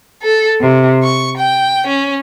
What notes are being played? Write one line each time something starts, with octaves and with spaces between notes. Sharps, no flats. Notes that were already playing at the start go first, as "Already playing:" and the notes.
A4
C3
C#6
G5
C#4